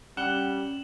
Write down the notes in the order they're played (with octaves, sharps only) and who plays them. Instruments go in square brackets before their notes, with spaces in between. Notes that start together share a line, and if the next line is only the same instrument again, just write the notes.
[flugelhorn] G3 [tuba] C#4 [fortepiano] F#5 [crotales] E7 F#7 G7